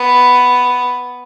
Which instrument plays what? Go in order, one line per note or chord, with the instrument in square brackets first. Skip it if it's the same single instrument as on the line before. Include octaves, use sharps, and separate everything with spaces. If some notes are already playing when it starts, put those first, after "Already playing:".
Already playing: [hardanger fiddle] B3